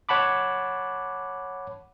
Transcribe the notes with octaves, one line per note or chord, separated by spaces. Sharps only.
C#5 F#5 A5 B5 D6